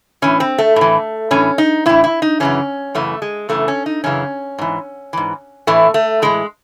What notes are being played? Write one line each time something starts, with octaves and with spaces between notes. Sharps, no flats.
A2 E3 C#4
C4
A3
A2 E3
A2 E3 C#4
D#4
A2 E3 E4
E4
D#4
F#2 C#3 E3 C#4
F#2 C#3 E3 A3
G#3
F#2 C#3 E3 A3
C#4
D#4
F#2 C#3 E3 C#4
G#2 E3
G#2 E3
A2 E3 A3
A3
A2 E3 G#3